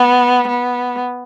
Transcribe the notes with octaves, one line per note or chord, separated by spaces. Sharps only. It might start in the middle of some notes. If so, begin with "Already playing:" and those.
Already playing: B3
B3